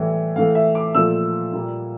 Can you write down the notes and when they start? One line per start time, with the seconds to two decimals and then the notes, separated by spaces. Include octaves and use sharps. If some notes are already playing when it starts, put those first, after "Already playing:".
Already playing: A2 E3 G3
0.36 A2 E3 A3 F5
0.55 E5
0.75 D6
0.95 A#2 F3 A3 E6
1.53 A#2 G3 A#3